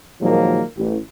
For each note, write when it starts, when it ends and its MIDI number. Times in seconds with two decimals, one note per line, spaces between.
0.21 0.61 46
0.21 0.61 51
0.21 0.61 53
0.21 0.61 54
0.21 0.61 56
0.21 0.61 58
0.77 0.96 33